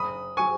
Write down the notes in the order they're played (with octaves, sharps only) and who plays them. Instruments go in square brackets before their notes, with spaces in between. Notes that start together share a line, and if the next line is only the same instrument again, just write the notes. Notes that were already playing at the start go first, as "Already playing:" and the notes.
Already playing: [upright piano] F#1 B5 D#6
F#3 G#5 C#6